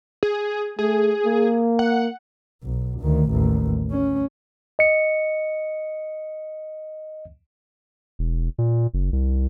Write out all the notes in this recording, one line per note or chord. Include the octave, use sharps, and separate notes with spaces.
G#4
A3 G#4
A#3
F#5
B1
D2 D#3
A1 D#2
C#4
D#5 C#7
E1
A#2
F#1
C2